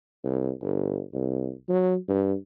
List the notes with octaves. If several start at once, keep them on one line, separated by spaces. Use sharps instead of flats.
C2
G1
C2
F#3
G2